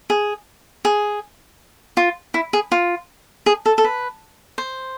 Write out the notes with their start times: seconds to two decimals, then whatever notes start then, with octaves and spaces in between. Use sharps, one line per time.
0.10 G#4
0.85 G#4
1.97 F4
2.34 E4
2.53 G#4
2.72 F4
3.46 G#4
3.66 A4
3.78 A4
3.84 B4
4.58 C5